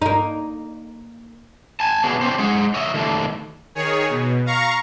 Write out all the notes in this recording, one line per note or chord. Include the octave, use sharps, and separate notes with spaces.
A#3 D#4
G#5 A5
B3 D4 F#4 G#4 C#5
C#4 D4 G4 C5
G#3 G#4 F#5
C#5 D#5 E5
D#3 A3 D4
D#3 G#4 C#5
B2
F5 A#5 C#6